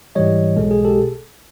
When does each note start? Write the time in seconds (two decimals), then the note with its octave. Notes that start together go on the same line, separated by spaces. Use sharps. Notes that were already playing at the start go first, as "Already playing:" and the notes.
0.15 G#2 E3 G3 C#5 D#5
0.57 B1 B2 G#3 A4
0.71 G#4
0.85 G4 A4